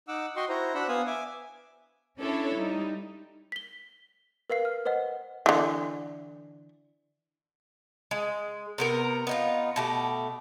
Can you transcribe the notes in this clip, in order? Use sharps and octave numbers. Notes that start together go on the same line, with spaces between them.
D#4 F#5 D6 E6
F#4 D#5 G5 C6 C#6
E4 F#4 C5 A#5
D4 F#4 C5 F#5 B5 E6
B3 F5 G#5 D#6
E5 G#5 D6
C#4 D4 E4 A4 C#5
G3 D#4
B6 G7
A#4 B4 F5 C7
F6
B4 C5 D#5 F#5
D3 E3
G#3
C3 B3 A#4
B3 D#4 F4
B2 A3 G4